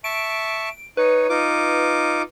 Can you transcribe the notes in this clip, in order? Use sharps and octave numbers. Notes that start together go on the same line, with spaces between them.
E5 A5 C#6 D7
D#4 B4 C#5
D#4 F4 D6